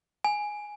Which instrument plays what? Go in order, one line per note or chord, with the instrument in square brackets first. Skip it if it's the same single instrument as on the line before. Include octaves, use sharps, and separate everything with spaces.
[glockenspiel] G#5